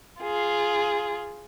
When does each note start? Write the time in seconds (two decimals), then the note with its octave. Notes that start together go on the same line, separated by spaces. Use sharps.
0.21 F4 G#4